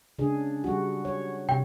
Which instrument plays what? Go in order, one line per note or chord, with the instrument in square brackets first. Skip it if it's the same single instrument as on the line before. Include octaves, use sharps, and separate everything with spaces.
[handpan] C#3 D4 G#4
G3 F#4
C#5
[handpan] C3 [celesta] G5